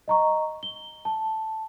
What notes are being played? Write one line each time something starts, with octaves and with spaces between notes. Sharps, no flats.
D#5 A#5 C#6
G7
A5